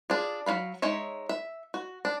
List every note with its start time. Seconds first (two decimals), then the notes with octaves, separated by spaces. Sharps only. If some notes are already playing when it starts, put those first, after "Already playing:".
0.10 D4 F4 G#4
0.46 F#3 F4 F5 B5
0.82 G#3 D#4 C#5 E5
1.29 E5
1.74 F#4
2.05 D4